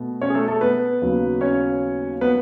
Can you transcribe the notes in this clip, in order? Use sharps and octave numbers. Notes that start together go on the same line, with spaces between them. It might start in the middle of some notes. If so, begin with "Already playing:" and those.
Already playing: B2 A3
C#4 C#5
G#4
A3 A4
A3 A4
B3 B4
D#2 C#3 F#3 B3
C#4 C#5
B3 B4